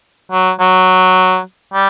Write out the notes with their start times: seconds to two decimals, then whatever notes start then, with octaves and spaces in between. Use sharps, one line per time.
0.32 F#3
0.60 F#3
1.74 G3